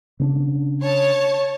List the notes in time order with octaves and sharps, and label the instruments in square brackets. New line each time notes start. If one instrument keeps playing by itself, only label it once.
[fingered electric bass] C#3 C4 D4
[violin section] C#5 A5